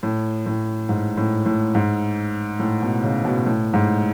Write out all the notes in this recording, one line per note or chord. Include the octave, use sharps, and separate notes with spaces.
A2
A2
G#2
A2
A2
G#2
A2
B2
C#3
B2
A2
G#2